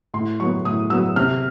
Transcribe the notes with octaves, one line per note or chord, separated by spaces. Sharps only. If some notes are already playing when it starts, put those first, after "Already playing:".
A2 C6
F#3 B3 C#6
A2 D#6
F#3 B3 E6
C3 F6